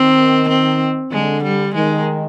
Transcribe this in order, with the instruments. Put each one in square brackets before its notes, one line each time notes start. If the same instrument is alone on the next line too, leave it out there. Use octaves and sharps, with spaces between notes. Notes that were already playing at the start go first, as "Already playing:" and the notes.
Already playing: [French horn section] D#3 [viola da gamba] C4
[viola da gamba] C4
[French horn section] D3 [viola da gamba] G#3
[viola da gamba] G3
[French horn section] D#3 [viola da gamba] G#3